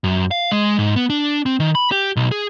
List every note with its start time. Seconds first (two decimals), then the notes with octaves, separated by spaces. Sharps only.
0.04 F#2
0.31 F5
0.52 G#3
0.79 G#2
0.96 B3
1.10 D4
1.46 C4
1.60 D#3
1.75 B5
1.92 G4
2.16 B1
2.31 G#4